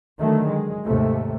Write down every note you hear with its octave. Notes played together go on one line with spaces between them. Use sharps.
D3 D#3 F#3 A3
G#3
D#2 G#2 C3 A3